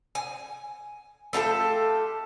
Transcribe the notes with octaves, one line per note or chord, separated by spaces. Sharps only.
G#5
A3 F4 G4 A4